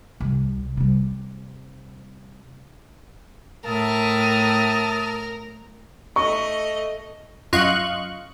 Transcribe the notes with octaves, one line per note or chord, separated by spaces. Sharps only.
C2
C3 G3
A2 A#4 E5 A5 D#6
A3 D#5 C#6
F#2 F4 D#5 F5 C#6 F#6